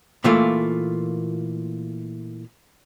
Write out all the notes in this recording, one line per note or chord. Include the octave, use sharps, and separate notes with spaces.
A#2 E3 A3 A#3 F4